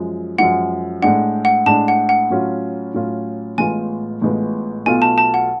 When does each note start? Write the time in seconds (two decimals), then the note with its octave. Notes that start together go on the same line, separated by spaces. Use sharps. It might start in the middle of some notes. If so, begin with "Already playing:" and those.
Already playing: F#2 F3 G#3
0.38 F#2 F3 G#3 F#5
1.02 A2 G#3 D4 F#5
1.45 F#5
1.66 A2 G#3 D4 A5
1.88 F#5
2.09 F#5
2.30 A2 F#3 C#4 F4
2.94 A2 F#3 C#4 F4
3.58 A1 A2 G#3 B3 F4 G#5
4.22 A1 A2 G#3 B3 F4
4.86 B1 B2 A3 F4 G#5
5.02 A5
5.18 A5
5.34 F#5